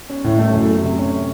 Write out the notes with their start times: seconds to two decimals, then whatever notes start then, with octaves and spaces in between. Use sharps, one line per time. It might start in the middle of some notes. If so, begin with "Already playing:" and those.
0.09 C#4
0.24 A2
0.39 A3
0.53 F#2
0.69 A3
0.83 C3
0.98 C#4